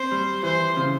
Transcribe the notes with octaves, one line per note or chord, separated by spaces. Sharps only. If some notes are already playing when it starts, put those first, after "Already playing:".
Already playing: C4 C5
G3
E3 C5
C#3